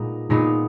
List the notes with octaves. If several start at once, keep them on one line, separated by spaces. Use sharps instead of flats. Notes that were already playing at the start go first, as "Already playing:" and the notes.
Already playing: A#2 G#3 B3 D#4
A#2 G#3 B3 D#4